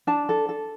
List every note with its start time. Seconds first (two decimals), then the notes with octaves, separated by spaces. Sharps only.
0.07 D4 A5
0.29 A4
0.49 A4